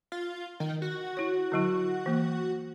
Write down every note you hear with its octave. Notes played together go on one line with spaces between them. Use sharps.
F4
D#3
F#4
E4 C#5
D3 F#3 E4
E3 A#3